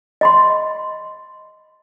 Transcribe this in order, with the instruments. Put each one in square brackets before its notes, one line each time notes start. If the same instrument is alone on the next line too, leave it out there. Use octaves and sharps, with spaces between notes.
[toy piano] D#5 B5 C6